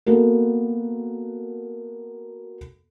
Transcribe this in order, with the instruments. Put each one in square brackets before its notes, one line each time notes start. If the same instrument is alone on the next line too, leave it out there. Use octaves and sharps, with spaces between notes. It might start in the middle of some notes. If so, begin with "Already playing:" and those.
[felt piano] A#3 B3 F#4 A4 A#4